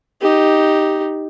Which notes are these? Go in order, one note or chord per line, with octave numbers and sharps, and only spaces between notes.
D#4 G4